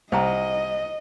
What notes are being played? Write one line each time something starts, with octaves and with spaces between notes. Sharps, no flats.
C2 C5 D#5 G5 A#5